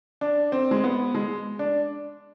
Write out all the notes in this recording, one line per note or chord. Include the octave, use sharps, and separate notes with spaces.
D4
C4
G#3
B3
G#3
D4